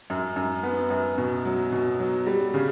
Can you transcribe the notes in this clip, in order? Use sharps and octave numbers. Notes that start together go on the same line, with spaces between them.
F#2
F#2
B3
F#2
B2
F#3
B2
F#3
G3
C#3